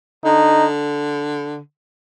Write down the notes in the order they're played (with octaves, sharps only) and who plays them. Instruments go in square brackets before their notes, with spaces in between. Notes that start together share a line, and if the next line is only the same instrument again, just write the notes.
[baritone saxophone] D3 [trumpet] D#4